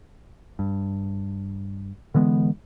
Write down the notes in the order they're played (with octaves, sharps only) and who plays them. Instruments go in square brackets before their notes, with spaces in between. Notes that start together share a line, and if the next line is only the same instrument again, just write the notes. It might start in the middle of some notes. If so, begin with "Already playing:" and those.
[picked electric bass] G2
D3 E3 G#3 B3